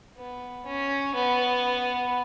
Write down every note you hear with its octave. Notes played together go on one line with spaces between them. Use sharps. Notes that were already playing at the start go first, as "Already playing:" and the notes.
B3
C#4
B3